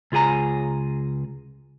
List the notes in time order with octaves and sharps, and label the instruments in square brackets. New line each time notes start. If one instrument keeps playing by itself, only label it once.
[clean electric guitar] C#2 F4 G#4 G#5 A#5